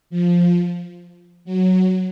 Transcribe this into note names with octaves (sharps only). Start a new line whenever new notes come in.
F3
F#3